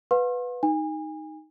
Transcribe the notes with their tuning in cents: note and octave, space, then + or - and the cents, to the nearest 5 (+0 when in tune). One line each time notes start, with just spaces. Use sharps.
B4 +0 F5 +45 C6 +45
D#4 +0 G#5 -30